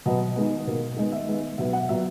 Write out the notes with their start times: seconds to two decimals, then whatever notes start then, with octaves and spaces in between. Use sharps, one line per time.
0.06 B2 F#3 B3 D#5
0.36 D#3 G#3 B3
0.67 B2 A#3
0.97 D#3 G#3 B3 D#5
1.12 E5
1.27 D#3 G#3 B3
1.58 B2 F#3 B3 E5
1.73 F#5
1.89 A#2 F#3 B3 E5